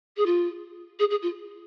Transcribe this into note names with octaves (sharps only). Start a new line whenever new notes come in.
G#4
F4
G#4
G#4
F4